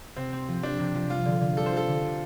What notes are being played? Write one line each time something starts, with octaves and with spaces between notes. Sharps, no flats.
C3 C4
C4
F3
D4 G4
C3
F3
G3 F4
D3
D3
G3 A4
C5
F4 A4
D3
C3